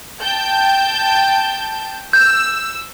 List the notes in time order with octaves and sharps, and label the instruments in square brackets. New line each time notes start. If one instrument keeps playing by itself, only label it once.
[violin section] G5 A5 G6
[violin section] E6 [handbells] G6